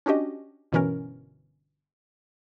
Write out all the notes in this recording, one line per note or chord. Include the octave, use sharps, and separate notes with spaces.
C#4 D4 F#4 G4 D#5
G1 B2 E3 C#4 A#4